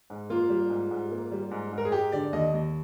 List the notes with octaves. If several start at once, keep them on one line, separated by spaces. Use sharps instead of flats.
G#2
A#3 F4
G3
G#2
G#2
A#3
G3
G#2
G#2 A#4
G#4
G#3 G4
D3 D5
D#2 D#5
D#2